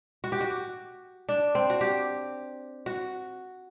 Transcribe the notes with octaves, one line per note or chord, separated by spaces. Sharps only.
F#4
G4
F#4
D4
C4
F#4
G4
F#4